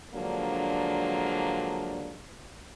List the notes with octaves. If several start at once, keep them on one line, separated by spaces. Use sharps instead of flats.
D3 F3 F#3 G#3 A#3 D4